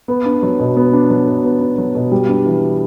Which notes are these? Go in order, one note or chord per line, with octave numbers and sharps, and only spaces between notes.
B3
D4
F#3
B2
B3
D4
F#3
B2
B3
D4
F#3
B2
G3
D4
E3